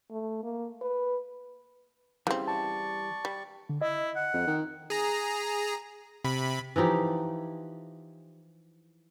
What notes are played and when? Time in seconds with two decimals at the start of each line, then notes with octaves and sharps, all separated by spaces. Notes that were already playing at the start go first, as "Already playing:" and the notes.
0.11 A3
0.43 A#3
0.82 B4
2.27 C#3 E3 G3 C4
2.48 D5 A5 C#6
3.25 G3
3.69 D3
3.81 E4 D#5
4.16 F#5
4.33 F2
4.47 D#3
4.90 G#4 A#5
6.24 C3 B5
6.76 E3 F3 D#4 G4